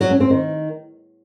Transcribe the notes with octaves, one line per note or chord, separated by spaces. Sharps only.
F#3
C#4
C4
D#3